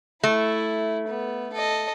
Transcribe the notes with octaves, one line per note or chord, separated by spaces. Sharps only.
A3 E4
B3
A4 D#5